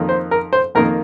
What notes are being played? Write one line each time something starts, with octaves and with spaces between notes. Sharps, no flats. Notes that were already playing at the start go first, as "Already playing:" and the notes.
Already playing: F2 D#3 A#3
C5
A#4
C5
F2 D#3 A#3 A#4